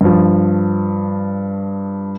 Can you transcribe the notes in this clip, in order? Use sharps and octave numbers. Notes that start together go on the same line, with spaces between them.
G2 F3